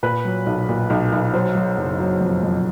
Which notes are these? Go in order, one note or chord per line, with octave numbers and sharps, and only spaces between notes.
A#2 B4
F#3
B1
A#2
B1
B1
F#3 C5
F#3
F#1
F#3
F2
F2